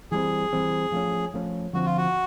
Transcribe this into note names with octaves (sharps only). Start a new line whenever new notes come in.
E3 G3 C4 G#4
E3 G3 C4
F3 A3 C#4
F3 A3 C#4
D3 F3 A3 C4 F#4
F4
F#4